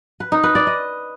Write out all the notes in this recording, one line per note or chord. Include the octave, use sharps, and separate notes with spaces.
B4
D#4
B4
D5
D#5